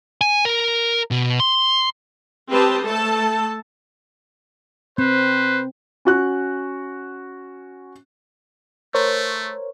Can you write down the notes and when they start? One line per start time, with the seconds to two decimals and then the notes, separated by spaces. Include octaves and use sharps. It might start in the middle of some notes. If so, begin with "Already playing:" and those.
0.21 G#5
0.45 A#4
1.11 B2
1.40 C6
2.51 C4 G4 B4 C5 D#5 A5
2.84 A3 A4 A5
4.98 C4 B4 C5
6.05 C#4 F#4 F#6
8.94 A3 A#4 C5 C#5